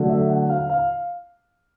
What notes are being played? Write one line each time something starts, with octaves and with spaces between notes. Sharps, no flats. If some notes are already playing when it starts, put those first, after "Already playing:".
Already playing: D3 F#3 A3
E5
F#5
F5
F5